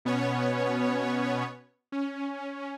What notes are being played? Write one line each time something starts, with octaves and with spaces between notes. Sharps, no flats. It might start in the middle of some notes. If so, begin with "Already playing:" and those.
B2 B3 C#4 C#5
C#4